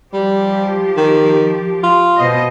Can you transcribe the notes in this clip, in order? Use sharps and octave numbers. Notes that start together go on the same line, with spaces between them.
F3 G3 G4
D#3
F4
B2 C5 D#5